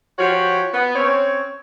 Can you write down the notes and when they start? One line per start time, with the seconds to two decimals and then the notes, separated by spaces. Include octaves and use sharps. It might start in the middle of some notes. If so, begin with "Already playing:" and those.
0.18 F3 F#4 G4 C#5
0.74 B3
0.95 C4 C#4 C#5